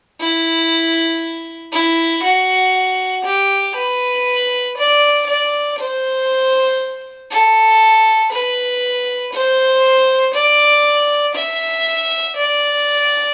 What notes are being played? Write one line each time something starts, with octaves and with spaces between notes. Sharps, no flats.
E4
E4
F#4
G4
B4
D5
D5
C5
A4
B4
C5
D5
E5
D5